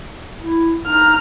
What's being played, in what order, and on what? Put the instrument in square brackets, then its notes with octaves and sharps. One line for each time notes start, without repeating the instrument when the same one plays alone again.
[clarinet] E4
[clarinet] D#4 [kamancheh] A#5 F6